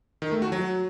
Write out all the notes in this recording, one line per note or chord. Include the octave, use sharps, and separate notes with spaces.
D#3
A3
F#4
F#3